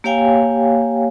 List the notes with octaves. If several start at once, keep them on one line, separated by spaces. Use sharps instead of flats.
A#3 G4 C#5 F5 G5 G#5